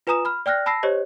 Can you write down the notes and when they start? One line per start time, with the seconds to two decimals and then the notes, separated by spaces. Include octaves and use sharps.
0.07 F4 B4 G#5 A#5 D#6 E7
0.25 B5 F6
0.46 D5 G5 F6 F#6 A#6
0.66 A5 B5 E6 A#6 C7
0.83 G4 C5 C#5 D#5